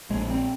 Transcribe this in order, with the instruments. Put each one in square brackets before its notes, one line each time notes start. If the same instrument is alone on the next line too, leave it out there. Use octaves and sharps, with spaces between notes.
[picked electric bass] A#1 G#3
C4